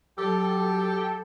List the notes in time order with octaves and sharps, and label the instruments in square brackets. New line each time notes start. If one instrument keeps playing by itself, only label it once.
[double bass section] F#3 [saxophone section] G4 [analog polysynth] A4